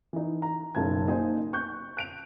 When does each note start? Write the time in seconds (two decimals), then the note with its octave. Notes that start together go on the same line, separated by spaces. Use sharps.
0.13 E3 D#4
0.42 A#5
0.75 F#1 B1 C#3 A5 G#6
1.08 A#3 D#4 C5 G#5
1.53 C#6 F#6 G6
1.97 F#6 D7 F7